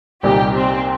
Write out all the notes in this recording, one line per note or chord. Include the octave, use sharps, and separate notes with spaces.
C2 A#2 G3 D#4 G4
C4